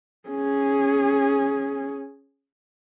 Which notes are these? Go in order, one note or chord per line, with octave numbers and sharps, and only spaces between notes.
C#4 G#4